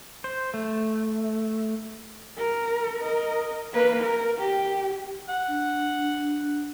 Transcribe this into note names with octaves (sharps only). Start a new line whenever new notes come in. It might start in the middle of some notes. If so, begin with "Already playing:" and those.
C5
A3
A#4
A#4 D#5
A#3 B4
A#4
G4
F#5
D4